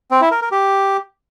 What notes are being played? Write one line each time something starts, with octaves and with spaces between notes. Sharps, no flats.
C4
E4
A#4
A#4
G4